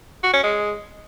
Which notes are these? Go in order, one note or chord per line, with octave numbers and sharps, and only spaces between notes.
F#4
C#4
G#3